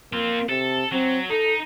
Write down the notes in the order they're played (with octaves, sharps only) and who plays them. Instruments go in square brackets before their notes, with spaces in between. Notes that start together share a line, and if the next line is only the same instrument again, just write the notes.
[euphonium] A#3 [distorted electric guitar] C4 F4
[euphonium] C3 [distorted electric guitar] A4
[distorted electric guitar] F#3 [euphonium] C4
[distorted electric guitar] D#4 [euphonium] A4